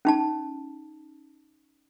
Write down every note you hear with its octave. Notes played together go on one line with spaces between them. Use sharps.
C#4 D#4 A5